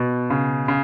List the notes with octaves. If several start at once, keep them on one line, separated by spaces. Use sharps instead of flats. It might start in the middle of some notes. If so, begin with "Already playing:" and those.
Already playing: B2
C#3
C#3